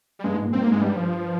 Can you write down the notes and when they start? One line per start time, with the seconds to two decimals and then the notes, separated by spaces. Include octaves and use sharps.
0.19 G3
0.24 G2 G#3
0.34 G#2
0.44 A#2
0.53 G2 C4
0.62 A#3
0.67 G#2 G#3
0.81 G2 G3
0.96 F3